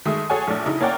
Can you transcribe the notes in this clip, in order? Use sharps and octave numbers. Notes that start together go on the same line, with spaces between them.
D#3 G#3 A3 E5 D#6
G#4 A4 C#5 F#5 G#5
A#1 A3 D4
C#3 D#4 E4
A#3 C#4 C#5 D5 F#5 G5